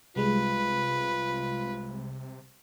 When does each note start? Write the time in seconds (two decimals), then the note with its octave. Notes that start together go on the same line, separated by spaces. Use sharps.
0.16 C2 C3 G3 G#3 F4 B4